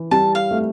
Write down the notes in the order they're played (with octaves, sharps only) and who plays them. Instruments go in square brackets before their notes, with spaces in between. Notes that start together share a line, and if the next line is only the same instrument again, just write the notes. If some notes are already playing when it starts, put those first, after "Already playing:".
Already playing: [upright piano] E3
[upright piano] G3 [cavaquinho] A5
[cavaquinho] F5
[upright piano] A3